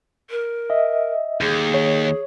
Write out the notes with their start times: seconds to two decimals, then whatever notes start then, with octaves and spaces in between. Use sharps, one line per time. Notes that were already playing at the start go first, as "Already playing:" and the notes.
0.30 A#4
0.70 D#5 E5
1.41 D#2 G#4
1.74 C#5